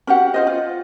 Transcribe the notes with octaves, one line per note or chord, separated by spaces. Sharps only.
C#4 F#4 G4 F#5
F4 C5 D#5
F4